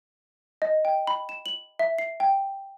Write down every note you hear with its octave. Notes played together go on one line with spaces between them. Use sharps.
D#5
G5
B5
E7
F#7
E5
C7
G5